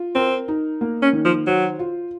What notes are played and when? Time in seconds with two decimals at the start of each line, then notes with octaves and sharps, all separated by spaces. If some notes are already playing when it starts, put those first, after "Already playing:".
Already playing: F4
0.15 C4 A#4
0.48 D#4
0.81 A#3
1.02 C#4
1.13 D#3
1.25 F3
1.47 F#3 C5
1.79 F4